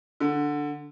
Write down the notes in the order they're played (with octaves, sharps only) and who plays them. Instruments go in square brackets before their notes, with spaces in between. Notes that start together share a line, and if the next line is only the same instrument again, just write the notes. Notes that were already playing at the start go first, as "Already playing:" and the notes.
[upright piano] D3